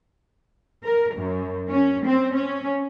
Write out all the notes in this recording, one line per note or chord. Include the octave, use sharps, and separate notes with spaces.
A#4
F#2
C#4
C4
C#4